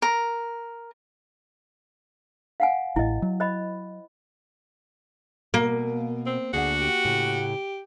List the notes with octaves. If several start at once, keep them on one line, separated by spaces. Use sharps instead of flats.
A#4
F5 F#5 G#5
A1 A2 E4 D#5
F#3
C5 D#5 B5
B2 A#3
C4
D2 D4 F#4 G#4 F#5
G4
A2 C#3